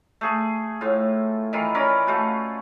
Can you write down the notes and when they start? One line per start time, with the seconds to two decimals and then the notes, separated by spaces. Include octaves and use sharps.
0.21 A3 G#4 C#6
0.81 A2 F4
1.53 D#3 E3 F4
1.75 C#4 A#4 D5 B5
2.07 A3 F4 F#4